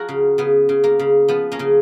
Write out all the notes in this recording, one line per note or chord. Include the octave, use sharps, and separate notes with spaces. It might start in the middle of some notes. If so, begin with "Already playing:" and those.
Already playing: F3 F#4 G#4 A#4
C#3
C#3 B3
C#3
A#3
C#3
F3 B3
A#3 C#4
C#3